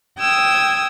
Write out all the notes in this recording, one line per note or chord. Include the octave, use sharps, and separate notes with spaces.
G5 D#6 E6 G#6